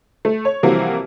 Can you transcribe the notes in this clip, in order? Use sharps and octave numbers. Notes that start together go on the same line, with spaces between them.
A3
C#5
C3 E3 F3 G3 A#3 F#4